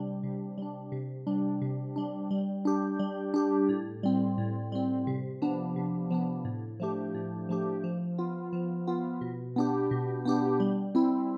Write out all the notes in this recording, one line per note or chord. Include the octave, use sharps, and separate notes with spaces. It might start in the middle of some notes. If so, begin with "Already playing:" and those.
Already playing: C3 G3 D4
C3
G3 D4
C3
G3 D4
C3
G3 D4
G3
D4 G4
G3
D4 G4
A2
G3 C4
A2
G3 C4
C3
F3 B3 D4
C3
F3 B3 D4
A2
F3 A3 D4 G4
A2
F3 A3 D4 G4
F3
B3 F4
F3
B3 F4
B2
B3 D4 G4
B2
B3 D4 G4
G3
C4 E4